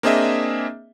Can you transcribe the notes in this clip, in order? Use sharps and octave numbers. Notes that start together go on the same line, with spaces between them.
A#3 C4 D4 G#4 D#5 E5